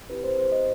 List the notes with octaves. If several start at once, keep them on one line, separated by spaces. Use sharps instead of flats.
C4 E4 G4 B4
C5
C5
D#5